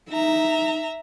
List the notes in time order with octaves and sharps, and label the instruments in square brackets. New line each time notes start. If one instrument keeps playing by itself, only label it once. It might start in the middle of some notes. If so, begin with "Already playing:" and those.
[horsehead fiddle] D#4 [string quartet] E5 A#5